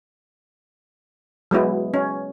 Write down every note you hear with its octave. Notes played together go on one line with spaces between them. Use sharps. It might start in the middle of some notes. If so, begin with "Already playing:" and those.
F#3 G#3 B3 E4
C#4